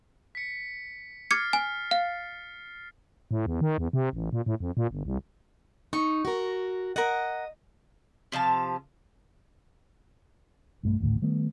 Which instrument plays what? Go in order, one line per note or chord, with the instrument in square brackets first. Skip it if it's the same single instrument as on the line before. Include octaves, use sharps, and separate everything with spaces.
[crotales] B6 C#7
[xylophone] D6 G#6 C#7 [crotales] F6 A6 C7
[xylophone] G#5
F5
[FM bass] A2
E2
D#3
E2
C3
A1
A#2
A2
F2
A#2
G1
C2
[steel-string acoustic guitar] D#4 [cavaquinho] C#6
[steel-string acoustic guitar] F#4 A#4
[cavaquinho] A#4 F#5 [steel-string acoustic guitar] D#5
[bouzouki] C3 F3 F5 A5
[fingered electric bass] B1 G2 A3
G#1 D2 A2
D#3 G3 A3 B3